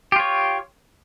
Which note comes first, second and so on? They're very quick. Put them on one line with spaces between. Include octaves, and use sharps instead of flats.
G4 F4 C#5